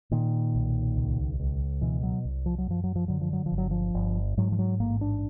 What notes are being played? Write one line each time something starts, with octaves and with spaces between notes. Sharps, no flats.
A#2 D#3
B1
C#2
C#2
B2 E3
F#3
C2
F3
F#3
F#2 F3
F#3
F3
D3 F#3
F3
F#3
F3
G1
F#3
F3
G1
G#2 F#3
F3
F#3
A1 A#3
D4